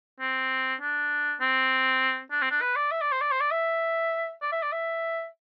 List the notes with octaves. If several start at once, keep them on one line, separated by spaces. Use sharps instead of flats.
C4
D4
C4
D4
C4
D4
B4
D5
E5
D5
C5
D5
C5
D5
E5
D5
E5
D5
E5